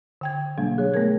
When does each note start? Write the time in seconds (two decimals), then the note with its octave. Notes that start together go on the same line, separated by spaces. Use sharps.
0.21 D3 G5 G#6
0.58 B2 F#3 G3 A#3 D4
0.78 G#4 C#5
0.94 A3 B3 A#4 G#6